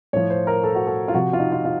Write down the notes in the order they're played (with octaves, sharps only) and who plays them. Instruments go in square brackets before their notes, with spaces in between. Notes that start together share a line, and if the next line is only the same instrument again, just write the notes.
[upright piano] A2 F3 C#5
C5
A#4
A4
F#4
A4
F4
C3 F3 F#4
F4
D#4
F4
F4